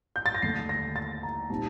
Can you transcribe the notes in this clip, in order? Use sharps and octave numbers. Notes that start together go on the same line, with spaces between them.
G6
A6
A#6
D#2 D3 A3 D4 C7
A#6
A6
A#5
A#2 G3 C4 D#4 A5